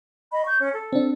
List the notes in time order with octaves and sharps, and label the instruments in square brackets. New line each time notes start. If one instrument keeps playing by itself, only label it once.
[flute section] D#5 B5
C#6 G6
C#4
A4
[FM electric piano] C4 D4